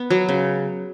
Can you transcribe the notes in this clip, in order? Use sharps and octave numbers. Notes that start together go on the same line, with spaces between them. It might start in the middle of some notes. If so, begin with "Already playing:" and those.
Already playing: B3
F#3
C#3